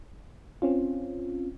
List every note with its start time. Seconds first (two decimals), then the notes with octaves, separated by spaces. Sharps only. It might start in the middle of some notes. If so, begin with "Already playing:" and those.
0.62 C4 C#4 F4